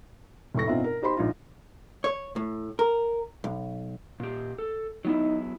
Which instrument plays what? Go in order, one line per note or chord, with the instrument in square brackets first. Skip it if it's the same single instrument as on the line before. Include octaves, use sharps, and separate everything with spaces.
[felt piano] F1 A2 C#6 A#6
G2 B2 C4 D#4 F4 E5
A#4
D#4 G4 C5 B5 C6
A#1 G#2 F4
[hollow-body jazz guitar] C#5
A2
A#4
B1
[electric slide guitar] A#2 G4
A4
[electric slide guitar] F#3 B3 E4 [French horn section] D#4